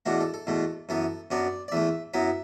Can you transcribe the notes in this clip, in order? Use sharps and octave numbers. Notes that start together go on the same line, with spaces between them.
E2 B2 A3 D4 F#4
A4
A4
E2 B2 A3
F#2 E3 B3 A4
F#2 F#3 B3 D4 D5
D5
E2 E3 A3 E5
F#2 F#3 B3 E4 E5